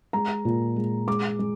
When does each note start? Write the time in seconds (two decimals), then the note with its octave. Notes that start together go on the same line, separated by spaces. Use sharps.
0.13 G#3 A#5
0.45 A#2
0.76 G#3
1.08 G#3 D6
1.39 G#3